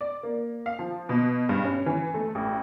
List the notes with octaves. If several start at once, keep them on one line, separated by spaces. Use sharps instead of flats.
D5
A#3
F5
F3
B2
G2
C#4
E3
A3
A1